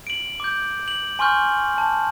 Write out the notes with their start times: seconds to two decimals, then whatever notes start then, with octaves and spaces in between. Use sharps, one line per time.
0.07 D7 F#7
0.40 D6 G6
0.88 F#7
1.19 G#5 C6 C#6 F6 G6
1.78 A5